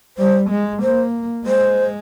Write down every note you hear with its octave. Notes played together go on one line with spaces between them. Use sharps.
G3 C5
G#3
A#3 C5
G#3 C5